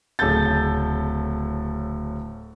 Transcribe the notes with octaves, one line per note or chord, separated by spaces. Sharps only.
D1 C#3 A4 G6 A6